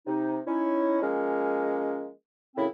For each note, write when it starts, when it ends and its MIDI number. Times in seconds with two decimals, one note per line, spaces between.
0.07 0.40 48
0.07 0.40 63
0.46 1.00 61
0.46 1.00 63
0.46 1.00 64
1.01 2.08 53
1.01 2.08 56
1.01 2.08 58
1.01 2.08 61
2.56 2.66 42
2.56 2.66 45
2.56 2.66 49
2.56 2.66 60
2.56 2.66 64
2.56 2.66 83